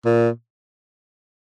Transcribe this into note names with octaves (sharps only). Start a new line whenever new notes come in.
A#2